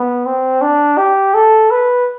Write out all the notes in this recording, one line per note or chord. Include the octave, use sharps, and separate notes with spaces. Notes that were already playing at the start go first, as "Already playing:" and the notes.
Already playing: B3
C4
D4
G4
A4
B4